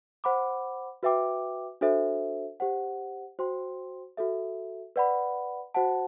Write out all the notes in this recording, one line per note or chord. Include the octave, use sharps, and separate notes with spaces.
C5 F#5 B5 D6
F#4 B4 E5 G5 D6
D4 F#4 A4 C5 E5
G4 C5 F#5
F#4 C5 G5 C6
F#4 A4 E5
B4 D5 F#5 B5
F#4 C5 F#5 A5